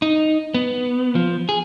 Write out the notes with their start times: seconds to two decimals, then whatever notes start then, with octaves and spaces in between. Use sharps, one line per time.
0.02 D#4
0.54 B3
1.15 F3
1.49 G#4